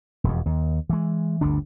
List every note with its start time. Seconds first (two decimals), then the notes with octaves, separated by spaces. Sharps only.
0.24 E1 F2
0.46 D#2
0.90 E3 G#3
1.41 G1 D2 D3 D4